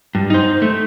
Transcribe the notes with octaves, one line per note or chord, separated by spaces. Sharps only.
G2
D#4 C5
A3